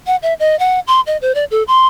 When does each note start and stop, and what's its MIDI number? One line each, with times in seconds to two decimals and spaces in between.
0.07 0.16 78
0.23 0.34 76
0.40 0.58 75
0.59 0.80 78
0.87 1.01 84
1.07 1.17 75
1.22 1.34 72
1.35 1.45 74
1.51 1.63 69
1.68 1.87 84